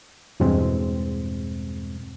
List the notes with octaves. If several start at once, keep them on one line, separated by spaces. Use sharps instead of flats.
E2 G2 B2 G#3 C4